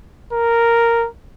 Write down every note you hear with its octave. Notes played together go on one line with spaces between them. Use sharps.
A#4